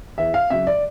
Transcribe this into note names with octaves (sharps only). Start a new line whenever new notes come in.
E2 E5
F5
C#3 F#3 E5
D5